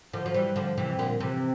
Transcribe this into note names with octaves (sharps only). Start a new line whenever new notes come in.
D3 F3
F3
E3 G3
D3 F3
C3 E3
A#2 D3
C3 E3